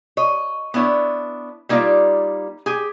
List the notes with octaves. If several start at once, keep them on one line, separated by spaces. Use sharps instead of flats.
C#5 D#5
B3 D4 E4 C#5
G3 A#3 D#4 F4 D5
G4 G#4